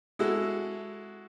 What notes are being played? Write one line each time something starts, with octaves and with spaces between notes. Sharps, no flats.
G#3 E4 F#4 A4